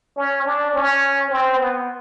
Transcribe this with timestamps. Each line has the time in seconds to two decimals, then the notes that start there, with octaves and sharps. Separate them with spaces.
0.17 C#4
0.45 D4
0.74 C#4
1.31 C4
1.59 B3